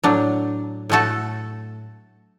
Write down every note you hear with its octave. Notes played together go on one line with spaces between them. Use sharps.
A2 F#3 D4
A2 A3 F#4 A4